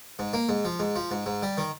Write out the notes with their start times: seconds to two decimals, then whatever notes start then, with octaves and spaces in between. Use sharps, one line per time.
0.19 G#2
0.33 A#3
0.49 G#2
0.65 F3
0.80 G#2
0.96 F3
1.11 G#2
1.26 G#2
1.43 G3
1.58 D#3